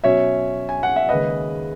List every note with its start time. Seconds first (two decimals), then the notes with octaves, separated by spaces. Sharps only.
0.04 B2 F#3 C#4 C#5 E5
0.69 G#5
0.83 F#5
0.96 E5
1.09 D#2 C#3 G#3 B4 D#5